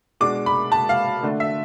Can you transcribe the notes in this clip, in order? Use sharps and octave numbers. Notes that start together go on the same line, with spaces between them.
B2 G#3 D4 D6
B5
A5
F5
D3 A3 D4
E5